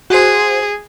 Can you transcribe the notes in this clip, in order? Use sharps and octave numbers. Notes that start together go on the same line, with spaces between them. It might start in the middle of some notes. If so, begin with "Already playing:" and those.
F#4 G#4 C5